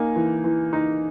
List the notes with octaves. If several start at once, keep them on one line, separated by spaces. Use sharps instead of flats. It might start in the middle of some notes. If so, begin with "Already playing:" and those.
Already playing: A#3 D#4 G#5
E3
E3
D#4